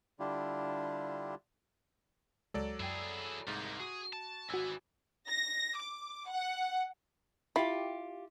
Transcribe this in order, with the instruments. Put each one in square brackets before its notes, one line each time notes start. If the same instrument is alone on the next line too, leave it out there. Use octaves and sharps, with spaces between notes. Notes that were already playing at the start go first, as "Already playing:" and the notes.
[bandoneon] D3 G3 D4 E4 F4 G4
[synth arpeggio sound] C#2 G#3 [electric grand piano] F#3 A4 D5
[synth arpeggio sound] F#2 G5 [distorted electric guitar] E4 G#4
[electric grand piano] C2 G#2 [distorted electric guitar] A#3 D#4 [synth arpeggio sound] A6
[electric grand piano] F#4 [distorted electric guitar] G#4
[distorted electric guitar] A5
[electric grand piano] G#1 [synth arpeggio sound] F#4 E6 [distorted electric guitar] B4 G#5
[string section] A#6
D6
F#5
[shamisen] E4 [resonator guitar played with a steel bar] F4 G4